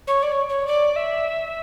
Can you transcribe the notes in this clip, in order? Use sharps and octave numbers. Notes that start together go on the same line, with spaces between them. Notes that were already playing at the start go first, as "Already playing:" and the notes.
C#5
D5
C#5
C#5
D5
E5